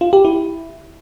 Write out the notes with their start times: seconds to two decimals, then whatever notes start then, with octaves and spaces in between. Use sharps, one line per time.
0.01 F4
0.13 G4
0.25 E4